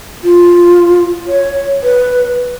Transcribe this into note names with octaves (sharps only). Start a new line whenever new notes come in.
F4
C#5
B4